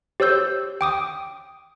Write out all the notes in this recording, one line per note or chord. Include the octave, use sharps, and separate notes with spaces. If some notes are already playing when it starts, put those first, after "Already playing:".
G4 C5 C#5 E6 G6
G5 D6 D#6